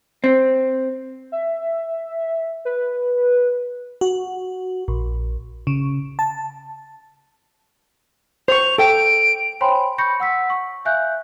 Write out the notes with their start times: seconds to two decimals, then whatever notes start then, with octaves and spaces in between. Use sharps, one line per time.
0.24 C4
1.32 E5
2.65 B4
4.01 F#4
4.88 A#1
5.67 C#3
6.19 A5
8.48 C5 C#6 F7
8.78 A4 G5 D7
9.61 C5 C#5 G5 G#5 B5 C6
9.98 B5 C#6 G6 A#6 C#7
10.20 F#5 E6 B6
10.50 C#6
10.85 E5 F5 G#5 F#6 G6